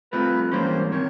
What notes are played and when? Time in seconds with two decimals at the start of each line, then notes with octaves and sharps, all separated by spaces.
0.12 C2 C3 F3 A3 B4
0.52 G#2 E3 G3 A#3 C#4 C5
0.92 C3 D#3 C#5